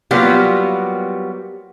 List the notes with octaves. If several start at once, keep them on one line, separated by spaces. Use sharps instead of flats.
F#3 G3 A#3 B3 F4 G4